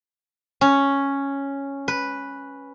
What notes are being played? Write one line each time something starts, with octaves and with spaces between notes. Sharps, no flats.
C#4
B4